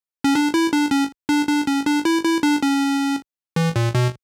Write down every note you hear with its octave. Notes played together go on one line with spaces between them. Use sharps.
C#4
D4
E4
D4
C#4
D4
D4
C#4
D4
E4
E4
D4
C#4
E3
A#2
B2